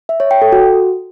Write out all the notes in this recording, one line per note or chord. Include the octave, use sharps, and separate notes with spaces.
E5
C#5
G5
A4
F#4